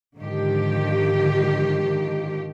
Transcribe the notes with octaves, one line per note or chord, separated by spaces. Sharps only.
G#2 D3 D#3 F3 G4